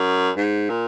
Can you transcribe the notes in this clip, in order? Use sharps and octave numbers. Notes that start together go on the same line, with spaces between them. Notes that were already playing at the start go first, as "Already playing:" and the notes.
Already playing: F#2
G#2
A#2